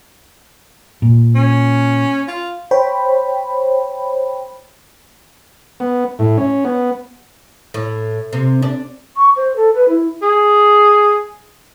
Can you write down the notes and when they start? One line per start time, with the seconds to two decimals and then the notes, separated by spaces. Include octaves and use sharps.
1.02 A#2
1.35 C#4
2.28 F4
2.71 C5 C#5 G5 B5
5.80 B3
6.19 A2
6.38 C#4
6.65 B3
7.74 A2
8.33 C3
8.62 D4
9.16 C#6
9.36 C5
9.56 A4
9.74 B4
9.89 E4
10.22 G#4